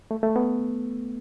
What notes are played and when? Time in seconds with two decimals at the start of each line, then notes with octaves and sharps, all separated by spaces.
0.11 A3
0.23 A3
0.36 B3